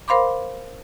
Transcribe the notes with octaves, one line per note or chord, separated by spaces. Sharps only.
A#4 C5 F5 B5 C6 D6